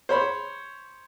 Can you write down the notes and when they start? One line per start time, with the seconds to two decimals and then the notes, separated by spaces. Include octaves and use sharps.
0.09 C5 C#5 B5